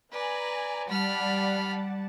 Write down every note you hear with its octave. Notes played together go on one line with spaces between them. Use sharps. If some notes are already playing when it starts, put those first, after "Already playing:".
B4 D5 G#5 A#5
G3 D5 F#5 A5 B5 F6